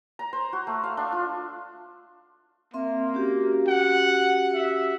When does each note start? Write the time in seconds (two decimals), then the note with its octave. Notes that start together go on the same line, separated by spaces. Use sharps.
0.19 A#5
0.33 C5
0.53 F#4
0.67 A3
0.83 F5
0.97 D4
1.12 F4
2.74 A#3 C4 E5 C6
3.14 C#4 F#4 G4
3.67 F#5
4.53 E5